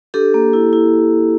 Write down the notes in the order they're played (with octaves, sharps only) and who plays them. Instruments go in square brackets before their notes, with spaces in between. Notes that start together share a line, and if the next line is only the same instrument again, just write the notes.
[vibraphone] D4 G4 A4
A#3
E4
E4